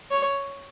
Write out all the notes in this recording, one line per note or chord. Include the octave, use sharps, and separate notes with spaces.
C#5